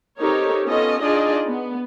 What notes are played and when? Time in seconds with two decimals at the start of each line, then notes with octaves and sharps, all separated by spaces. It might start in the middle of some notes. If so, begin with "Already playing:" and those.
0.19 C4 D#4 G4 A4 A#4 C#5
0.65 B3 C#4 F4 A4 D#5
1.02 D4 D#4 F4 G#4 D5 D#5
1.45 B3